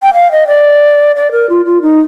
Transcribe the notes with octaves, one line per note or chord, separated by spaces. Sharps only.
G5
F5
D#5
D5
D5
A#4
F4
F4
D#4